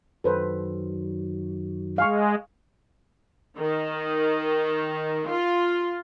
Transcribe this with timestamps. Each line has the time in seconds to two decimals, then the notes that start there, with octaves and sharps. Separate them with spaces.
0.24 F#2 D#3 F#3 A4 B4 C5
1.98 G#3 F5 G#5 C#6
3.58 D#3
5.30 F4